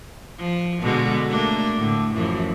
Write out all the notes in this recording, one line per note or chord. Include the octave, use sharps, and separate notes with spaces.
F3
B2 D3 G#3
A3 A#3 D4
A2 D3
F#2 E3 F3